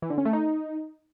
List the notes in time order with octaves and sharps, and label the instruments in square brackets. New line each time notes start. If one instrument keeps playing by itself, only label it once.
[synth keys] E3
D3
C#4
A3
D#4